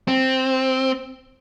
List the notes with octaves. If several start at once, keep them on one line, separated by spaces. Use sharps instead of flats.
C4